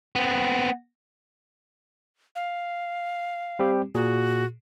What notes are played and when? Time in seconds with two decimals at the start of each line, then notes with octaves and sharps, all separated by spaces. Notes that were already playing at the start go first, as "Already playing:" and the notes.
0.15 B3 C4
2.35 F5
3.59 G3 C4 G4
3.95 A#2 F#4 G#4